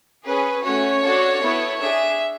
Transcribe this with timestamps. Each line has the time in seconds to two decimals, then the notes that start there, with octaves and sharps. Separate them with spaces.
0.25 C#4 G#4 B4
0.63 A3 C#4 F#4 C#5
1.02 D4 F#4 A4
1.41 B3 E4 A4
1.80 D4 G#4 E5